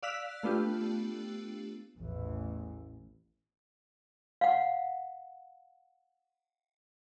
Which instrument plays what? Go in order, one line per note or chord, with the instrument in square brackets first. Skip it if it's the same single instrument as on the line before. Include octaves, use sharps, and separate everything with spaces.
[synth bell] D5 F5 E6 F#6 B6
A3 B3 D4 F4 G4
[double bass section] A1 E2 E3
[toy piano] F5 F#5